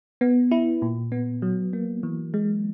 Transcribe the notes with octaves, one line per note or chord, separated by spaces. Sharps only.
B3
E4
A#2
B3
F#3
A#3
E3
G#3